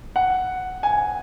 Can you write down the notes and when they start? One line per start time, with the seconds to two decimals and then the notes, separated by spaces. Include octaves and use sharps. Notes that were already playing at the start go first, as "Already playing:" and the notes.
0.16 F#5
0.83 G#5